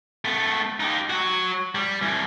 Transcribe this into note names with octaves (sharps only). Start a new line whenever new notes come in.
A3 B3
D#4 G4
F#3 F#4
G3
C2 E3